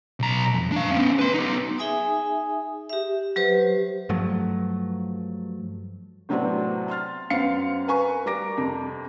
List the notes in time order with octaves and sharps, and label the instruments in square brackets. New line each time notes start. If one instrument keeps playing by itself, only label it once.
[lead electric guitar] B1 A#5
F2
D4 F5
B3 C#4
B4 C6
B3 D#4
[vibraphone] D#4 G#4 E5 G#5 D#6
G4 E5
F#3 G4 B4 C5
[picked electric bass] G2 F3 F#3 A3
[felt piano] A2 C3 F#3 B3 C4 D4
C6 F6 A6
F#2 B3 C4 F5 C7 C#7
A#4 B4 G#5 C#6
G3 A#4 D6 A#6 D7
F2 C3